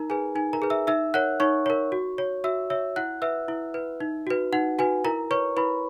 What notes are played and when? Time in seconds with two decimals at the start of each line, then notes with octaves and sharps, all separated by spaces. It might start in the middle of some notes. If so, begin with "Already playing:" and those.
Already playing: D#4 A#4 A#5
0.10 G#4 B4 G#5
0.35 D#4 G#5
0.53 A#4 A#5
0.62 G#4 B4
0.70 E5 E6
0.87 D#4 E5 E6
1.14 A#4 C#5 F#5 F#6
1.40 D#4 C#5 C#6
1.66 A#4 C#5
1.92 F#4
2.18 C#5
2.44 F#4 E5 E6
2.70 C#5 E5 E6
2.96 E4 F#5 F#6
3.22 B4 E5 E6
3.48 E4
3.74 B4
4.00 D#4
4.27 F#4 B4
4.53 D#4 F#5
4.79 F#4 B4 G#5
5.04 E4 A#4 A#5
5.31 B4 C#5 C#6
5.57 E4 B4 B5